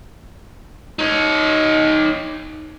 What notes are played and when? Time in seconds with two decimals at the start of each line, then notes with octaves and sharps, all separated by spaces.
0.99 D#4 C#5